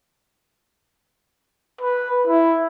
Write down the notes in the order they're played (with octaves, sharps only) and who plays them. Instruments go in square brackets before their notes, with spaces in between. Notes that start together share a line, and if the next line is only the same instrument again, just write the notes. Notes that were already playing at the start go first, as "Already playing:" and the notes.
[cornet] B4
E4